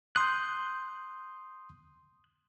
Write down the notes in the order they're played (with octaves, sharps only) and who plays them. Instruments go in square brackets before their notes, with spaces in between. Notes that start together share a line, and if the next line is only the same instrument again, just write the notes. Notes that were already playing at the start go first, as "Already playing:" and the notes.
[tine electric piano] C6 D#6 [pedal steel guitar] F#6 G6